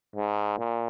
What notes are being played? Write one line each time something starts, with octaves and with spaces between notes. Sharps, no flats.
G#2
A#2